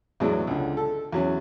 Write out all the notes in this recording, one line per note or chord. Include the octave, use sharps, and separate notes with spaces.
E2 A2 E3 F#3 G#3 D4
C#2 D3
A4
E2 F#3 C#4